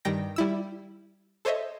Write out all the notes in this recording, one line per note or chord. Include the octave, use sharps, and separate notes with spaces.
G2 D#3 G3 G5 A#6
G3 E4 E6
A4 C5 C#5 D#5 E5